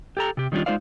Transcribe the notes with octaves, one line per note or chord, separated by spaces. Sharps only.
G4 A4 A#5
C3 G4
D#3 G3 C#4 D4 F4
G#3 D#4 F4 C5 D5 F5